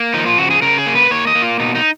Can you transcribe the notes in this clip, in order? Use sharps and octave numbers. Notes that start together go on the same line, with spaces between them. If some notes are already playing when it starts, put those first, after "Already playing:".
Already playing: A#3
F3 D#4
F4
C#3 F#4
G#4
C#3 A#4
G#4
A#3
B4
A#3 C#5
D#5
A#3
F4
B2 D#4
D#4